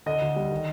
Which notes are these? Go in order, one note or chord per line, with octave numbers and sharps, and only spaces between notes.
D3 D#5
D2
G3
D#3